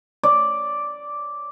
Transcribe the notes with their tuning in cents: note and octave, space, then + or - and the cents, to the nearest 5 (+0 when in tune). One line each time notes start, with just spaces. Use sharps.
D5 -5